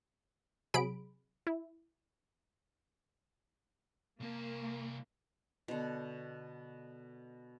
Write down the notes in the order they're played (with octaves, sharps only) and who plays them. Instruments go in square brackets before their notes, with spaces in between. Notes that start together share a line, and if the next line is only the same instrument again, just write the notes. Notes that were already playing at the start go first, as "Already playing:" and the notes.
[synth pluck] C3 F#3 G#4 B5 D7
E4
[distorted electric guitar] C2 A5 [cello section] A#3
[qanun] B2 D3